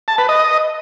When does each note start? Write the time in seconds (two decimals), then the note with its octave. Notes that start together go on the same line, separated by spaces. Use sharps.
0.08 A5
0.18 B4
0.29 D#5